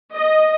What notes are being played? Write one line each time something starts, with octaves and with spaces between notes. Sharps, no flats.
D#5